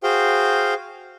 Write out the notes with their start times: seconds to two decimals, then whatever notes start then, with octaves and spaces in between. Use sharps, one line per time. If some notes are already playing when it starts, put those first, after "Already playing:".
0.03 F#4 G#4 C5 F5 G5